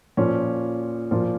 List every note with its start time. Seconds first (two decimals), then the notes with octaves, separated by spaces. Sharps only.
0.17 A#2 F3 C#4
1.11 A#2 F3